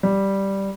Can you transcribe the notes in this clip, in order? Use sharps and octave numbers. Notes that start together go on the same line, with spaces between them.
G3